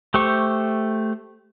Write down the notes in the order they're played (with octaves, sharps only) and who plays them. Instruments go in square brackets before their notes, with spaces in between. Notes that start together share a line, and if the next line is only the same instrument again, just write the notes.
[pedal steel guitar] A3 G4 C5 C#6